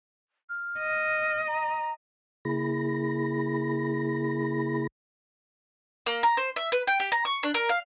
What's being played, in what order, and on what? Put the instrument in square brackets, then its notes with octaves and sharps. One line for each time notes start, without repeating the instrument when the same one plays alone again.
[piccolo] F6
[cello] D#5
[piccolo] A#5
[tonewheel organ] C#3 A#3 E4 G#4 B5 A#6
[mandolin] A#3
A#5
C5
E5
B4
G5
G4
A#5
C#6
D4
A#4
F5